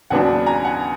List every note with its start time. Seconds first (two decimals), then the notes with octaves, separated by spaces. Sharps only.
0.10 D#2 C#3 F#3 B3 D4 F#5 G#5
0.46 G#5 A#5
0.65 F#5 G#5